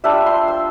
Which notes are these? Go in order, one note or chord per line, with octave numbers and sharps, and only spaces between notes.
G3 D4 F4 E5
C6
E6